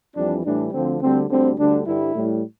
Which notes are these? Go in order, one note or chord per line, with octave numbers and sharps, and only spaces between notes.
F2 E3 G3 D4
A2 E3 G3 D4
D2 D3 F3 C4
D2 D3 G3 C4
D2 D3 G3 C4
D2 D3 G3 D4
G2 D3 G3 E4
A2 G3